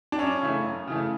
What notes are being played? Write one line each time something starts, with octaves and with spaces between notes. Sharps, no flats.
D4
F#2 C#4
C#3 E3 A3
F#2
C#3 E3 A3